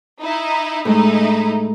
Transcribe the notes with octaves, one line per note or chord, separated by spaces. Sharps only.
D#4 E4
A2 G#3 A3 D#4 E4